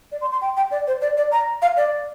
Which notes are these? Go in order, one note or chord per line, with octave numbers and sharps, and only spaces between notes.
D5
C6
C6
G5
G5
D5
C5
D5
D5
A#5
F5
D5